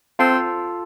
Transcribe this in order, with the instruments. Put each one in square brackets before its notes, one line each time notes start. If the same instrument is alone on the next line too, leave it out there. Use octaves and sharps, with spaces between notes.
[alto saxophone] C4 [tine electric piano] F4 A4